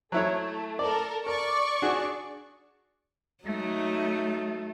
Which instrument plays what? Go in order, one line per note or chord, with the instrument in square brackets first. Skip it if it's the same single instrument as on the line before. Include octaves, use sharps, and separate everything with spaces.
[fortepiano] F#3 E4 C#5 [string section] A3
[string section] A4 A#4 [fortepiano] D5
[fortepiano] A#4 [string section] D5 C#6
[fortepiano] D4 F#4 G#4
[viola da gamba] F#3 D#4 [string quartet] A3